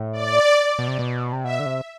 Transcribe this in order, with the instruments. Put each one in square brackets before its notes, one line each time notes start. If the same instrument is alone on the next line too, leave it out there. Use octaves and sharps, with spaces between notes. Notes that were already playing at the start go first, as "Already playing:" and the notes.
Already playing: [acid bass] A2
[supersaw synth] D5
[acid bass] B2
C3
B2
C3
[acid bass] B2 [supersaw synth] E5
[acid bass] D3
C3